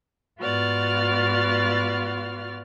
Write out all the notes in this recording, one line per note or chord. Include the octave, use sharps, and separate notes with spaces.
G#2 B3 F4 F#4 D5 F6